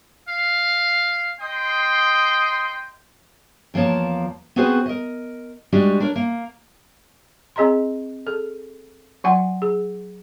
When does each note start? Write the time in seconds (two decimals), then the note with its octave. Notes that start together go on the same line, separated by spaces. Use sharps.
0.29 F5
1.40 D#5 G5 C6
3.74 E2 F3 A#3 C#5 A5
4.56 B3 C4 F#4 G#4 B4 C5
4.86 A#4 D#5
5.72 G3 G#3 D4 F#4 G4
6.00 D4 A#4 C#5
6.16 A#3
7.56 C4 G#4 D#5 A#5 C6
8.26 G#4 A4
9.24 F#3 F#5 G#5 C6
9.62 G#4